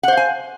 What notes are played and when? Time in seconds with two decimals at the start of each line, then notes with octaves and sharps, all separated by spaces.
0.03 F#5
0.08 C5
0.13 F5
0.17 G#5